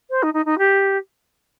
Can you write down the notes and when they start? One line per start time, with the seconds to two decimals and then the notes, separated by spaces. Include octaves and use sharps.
0.10 C5
0.23 D#4
0.34 D#4
0.46 D#4
0.58 G4